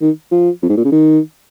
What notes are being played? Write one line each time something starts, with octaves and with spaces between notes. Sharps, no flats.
D#3
F3
F2
G#2
A#2
C#3
D#3